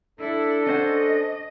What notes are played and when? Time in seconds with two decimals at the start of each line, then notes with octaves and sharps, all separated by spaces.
0.20 D4 E4 A4
0.66 C#4 C5 D#5 F#5